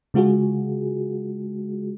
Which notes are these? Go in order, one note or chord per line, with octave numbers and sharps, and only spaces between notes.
C#3 G#3 F4 F#4 G#4